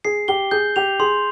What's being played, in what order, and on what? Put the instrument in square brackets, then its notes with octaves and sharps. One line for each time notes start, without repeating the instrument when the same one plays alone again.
[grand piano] G#4 [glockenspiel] C7
[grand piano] G4 [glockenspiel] G7
[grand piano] G#4 [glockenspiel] G6
[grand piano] G4 [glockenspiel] F7
[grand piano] G#4 [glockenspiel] C6